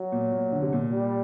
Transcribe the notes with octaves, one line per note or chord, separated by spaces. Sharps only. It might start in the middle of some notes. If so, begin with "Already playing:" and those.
Already playing: F#3
A#2
A#2
D3
C3
A#2
G3